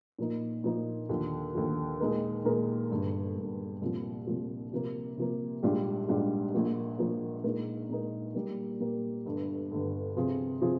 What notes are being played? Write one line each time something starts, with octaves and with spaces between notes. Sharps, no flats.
A#2 F3 A#3 D#4
A#2 F3 A#3 D#4
D#2 D3 F3
D#2 D3 F3
A#2 G#3 D#4 A#4
A#2 G#3 D#4 A#4
G1 G2 D3
G1 G2 D3
C2 A#2 F3
C2 A#2 F3
C3 F3 A#3
C3 F3 A#3
A#1 G#2 G3 D4 F4
A#1 G#2 G3 D4 F4
A#1 A#2 F3 A#3
A#1 A#2 F3 A#3
A#2 G#3 D#4 A#4
A#2 G#3 D#4 A#4
A#2 G3 A#3
A#2 G3 A#3
G1 G2 D3
G1 G2 D3
C3 F3 C4 F4 G#4
C3 F3 C4 F4 G#4